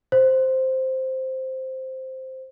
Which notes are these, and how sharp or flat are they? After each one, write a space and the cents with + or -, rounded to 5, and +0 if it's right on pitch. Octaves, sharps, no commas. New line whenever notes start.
C5 +0